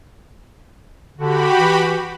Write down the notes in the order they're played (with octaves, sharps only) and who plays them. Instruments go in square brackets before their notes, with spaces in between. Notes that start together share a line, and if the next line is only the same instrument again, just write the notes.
[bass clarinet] D3 [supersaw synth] F#4 G4 B5
[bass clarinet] E3